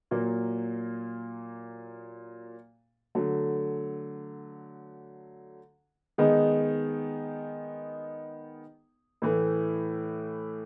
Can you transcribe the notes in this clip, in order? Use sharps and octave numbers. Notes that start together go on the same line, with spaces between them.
A#2 F#3 A#3
D3 F#3 A3
D#3 G#3 B3 D#4 G#4
A2 E3 A3